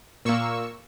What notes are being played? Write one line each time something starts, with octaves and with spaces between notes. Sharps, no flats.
A#2 A#3 C#6 E6